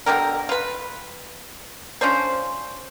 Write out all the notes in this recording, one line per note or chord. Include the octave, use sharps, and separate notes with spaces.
B2 D3 G4 A#4
F4 B4
F3 C#4 D4 C5